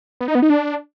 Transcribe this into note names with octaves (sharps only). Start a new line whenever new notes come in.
B3
D#4
B3
D#4
D4